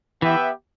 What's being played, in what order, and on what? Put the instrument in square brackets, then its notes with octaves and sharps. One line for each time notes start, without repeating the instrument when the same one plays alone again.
[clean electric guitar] E3 [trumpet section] B3 G4 B4 E5 G5